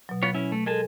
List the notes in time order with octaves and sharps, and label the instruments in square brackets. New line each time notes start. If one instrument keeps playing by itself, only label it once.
[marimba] B2 F#3
[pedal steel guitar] B3 F4 C#5
C#4 E4
A3
[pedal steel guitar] G#3 G#5 A5 [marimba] A4 A#4